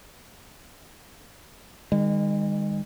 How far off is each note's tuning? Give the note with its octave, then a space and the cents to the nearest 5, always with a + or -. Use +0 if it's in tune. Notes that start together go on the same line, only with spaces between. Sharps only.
D#3 -10 G#3 -40